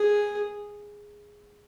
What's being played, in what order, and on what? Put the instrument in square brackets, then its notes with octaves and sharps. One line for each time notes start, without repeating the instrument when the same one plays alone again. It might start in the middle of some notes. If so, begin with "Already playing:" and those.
Already playing: [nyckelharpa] G#4